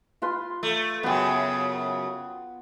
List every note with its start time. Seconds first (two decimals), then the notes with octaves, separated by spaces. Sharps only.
0.22 F4 B4 C6
0.63 A3
1.03 F#2 C#3 B3 G5